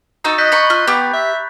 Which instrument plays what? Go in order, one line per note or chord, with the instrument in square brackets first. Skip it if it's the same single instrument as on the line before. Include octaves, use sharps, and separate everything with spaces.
[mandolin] D#4 F#4 E6 [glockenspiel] A#5 A6
[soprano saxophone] D#5 [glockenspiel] F#6 G6 B6
[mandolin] B5 C#6
[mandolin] F4 [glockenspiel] C#6 F#6
[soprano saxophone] B3 [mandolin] G4 [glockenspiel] B5
[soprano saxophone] E5